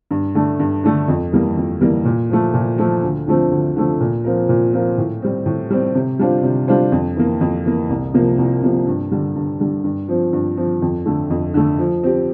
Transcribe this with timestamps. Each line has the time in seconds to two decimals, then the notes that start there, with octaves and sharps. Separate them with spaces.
0.11 G2
0.35 D3 A3 D4
0.59 G2
0.84 D3 A3 D4
1.08 F2
1.32 E3 G3 A#3
1.57 F2
1.81 E3 G3 A#3
2.05 A#2
2.30 F3 A3
2.54 A#2
2.78 F3 A3
3.03 D2
3.27 D3 F3 A3 C4
3.51 D2
3.76 D3 F3 A3 C4
4.00 A#2
4.24 F3 C4 F4 A#4
4.49 A#2
4.73 F3 C4 F4 A#4
4.98 A2
5.22 G3 C4
5.46 A2
5.70 G3 C4
5.95 C3
6.19 G3 D4 F4 C5
6.43 C3
6.68 G3 D4 F4 C5
6.92 F2
7.17 E3 A#3
7.41 F2
7.65 E3 A#3
7.90 C2
8.14 C3 F3 A#3
8.38 C2
8.63 C3 F3 A#3
8.87 G2
9.12 D3 G3
9.36 G2
9.60 D3 G3
9.84 G2
10.08 F3 C4
10.33 G2
10.57 F3 C4
10.82 F2
11.06 D3 A3
11.30 F2
11.54 D3 A3
11.79 F3
12.03 C4 G4